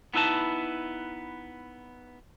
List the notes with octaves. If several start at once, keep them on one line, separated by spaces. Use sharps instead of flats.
B3 D#4 E4 B4 A5